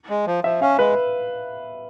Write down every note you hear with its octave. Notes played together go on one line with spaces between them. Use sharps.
G#3
F3
F3 E5
C#4 F5
G#3 B4